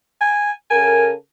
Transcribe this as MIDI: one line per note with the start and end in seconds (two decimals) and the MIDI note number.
0.21 0.51 80
0.70 1.13 49
0.70 1.13 69
0.70 1.13 70
0.70 1.10 80